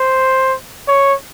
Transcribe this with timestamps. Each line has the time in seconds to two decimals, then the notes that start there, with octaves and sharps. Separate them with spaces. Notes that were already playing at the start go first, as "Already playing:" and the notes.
Already playing: C5
0.88 C#5